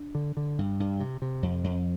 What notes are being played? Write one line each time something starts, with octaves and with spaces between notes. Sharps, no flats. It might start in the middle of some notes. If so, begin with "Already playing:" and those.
Already playing: D4
D3
D3
G2
G2
C3
C3
F2
F2